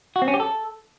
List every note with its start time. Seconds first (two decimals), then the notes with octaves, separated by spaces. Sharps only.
0.16 F#4
0.22 C4
0.28 C#4
0.34 G4
0.40 A4